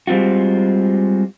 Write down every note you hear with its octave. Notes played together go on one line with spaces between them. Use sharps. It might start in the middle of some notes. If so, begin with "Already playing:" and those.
G3 G#3 C4 F4 F#4